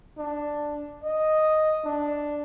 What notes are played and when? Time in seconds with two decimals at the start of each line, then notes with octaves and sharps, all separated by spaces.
0.19 D4
1.04 D#5
1.85 D4